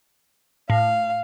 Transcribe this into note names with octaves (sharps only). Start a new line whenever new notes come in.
A2 F5